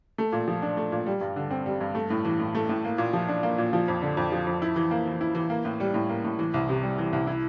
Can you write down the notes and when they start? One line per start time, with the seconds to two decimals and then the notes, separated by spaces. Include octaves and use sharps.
0.18 A3
0.32 A#2
0.48 F3
0.62 D4
0.77 A3
0.92 A#2
1.06 G3
1.21 G2
1.36 D3
1.51 C4
1.66 G3
1.81 G2
1.95 A3
2.10 A2
2.25 E3
2.39 A2
2.55 A3
2.69 A2
2.84 A#3
2.98 A#2
3.13 F3
3.29 D4
3.43 A#3
3.58 A#2
3.73 F3
3.88 F2
4.02 D3
4.17 F2
4.32 F3
4.47 F2
4.62 E4
4.76 E3
4.91 A#3
5.06 E3
5.21 E4
5.35 E3
5.50 A#3
5.65 A2
5.80 G3
5.94 A2
6.09 A#3
6.24 A2
6.39 E3
6.54 C2
6.69 C3
6.83 G3
6.98 E3
7.13 C2
7.27 E4